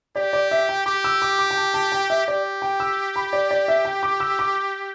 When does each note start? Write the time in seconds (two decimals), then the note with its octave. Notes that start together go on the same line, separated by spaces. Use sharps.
0.16 G4 D5
0.33 D5
0.51 E5
0.69 G5
0.86 G4 D6
1.04 E6
1.22 D6
1.39 D6
1.51 G5
1.57 A5
1.74 A5
1.92 G5
2.10 E5
2.27 G4 D5
2.62 G5
2.80 E6
3.16 B5
3.33 D5
3.51 D5
3.68 E5
3.85 G5
4.03 D6
4.20 E6
4.39 D6